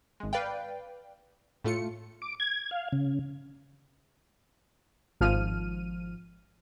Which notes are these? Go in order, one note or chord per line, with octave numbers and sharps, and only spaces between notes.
G#1 G#3
B4 D5 F5 G5
A2 A3 F4 C#7
D6
G#6
F5
C#3
G#1 F3 F6 D#7